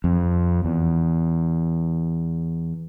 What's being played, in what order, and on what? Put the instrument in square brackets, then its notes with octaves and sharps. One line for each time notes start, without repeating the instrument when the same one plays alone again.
[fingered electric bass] F2
E2